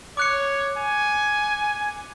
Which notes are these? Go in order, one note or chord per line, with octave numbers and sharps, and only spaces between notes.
C#5 D6 F#6 C#7
G#5